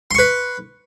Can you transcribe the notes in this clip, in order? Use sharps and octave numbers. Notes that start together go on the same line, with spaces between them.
B4 C6 C#6